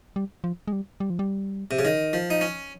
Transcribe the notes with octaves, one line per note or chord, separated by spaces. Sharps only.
G3
F3
G#3
G3
G3
F3
G3
C3
C#3
D#3
F3
D#4
C#4